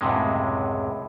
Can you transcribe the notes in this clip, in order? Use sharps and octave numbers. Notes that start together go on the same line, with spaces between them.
C#2 F#2 A2 C3 G#3